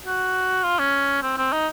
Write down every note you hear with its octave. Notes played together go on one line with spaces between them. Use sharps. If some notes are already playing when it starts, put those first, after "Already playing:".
F#4
F4
C#4
C4
C4
D#4